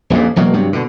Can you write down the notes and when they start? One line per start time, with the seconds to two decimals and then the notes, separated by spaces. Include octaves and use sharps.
0.10 D#1 A#1 F2 A#2
0.36 E1 B2 F#3 A#3
0.53 G2 C3 F#3
0.73 B2 D3